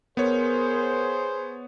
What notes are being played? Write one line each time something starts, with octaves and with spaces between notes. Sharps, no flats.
B3 G#4 A#4 C5 C#5